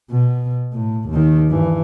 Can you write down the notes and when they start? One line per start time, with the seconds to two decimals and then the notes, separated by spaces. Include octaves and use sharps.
0.11 B2
0.73 A2
1.09 D#2 D#3
1.49 G2 E3